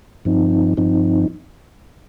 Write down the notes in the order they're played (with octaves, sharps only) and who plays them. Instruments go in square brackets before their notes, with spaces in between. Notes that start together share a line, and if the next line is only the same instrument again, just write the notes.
[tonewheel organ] G2 F3 C4 D#4
G2 F3 C4 D#4